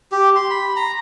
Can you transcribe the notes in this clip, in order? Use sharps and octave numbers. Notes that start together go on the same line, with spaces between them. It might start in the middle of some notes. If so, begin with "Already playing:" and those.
G4
C6
B5
A#5